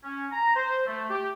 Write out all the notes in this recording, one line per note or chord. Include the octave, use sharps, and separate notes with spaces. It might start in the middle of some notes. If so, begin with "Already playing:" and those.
C#4
A#5
C5
A3
G4